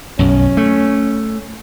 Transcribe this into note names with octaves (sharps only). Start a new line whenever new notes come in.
B1 F#2 C#4
A3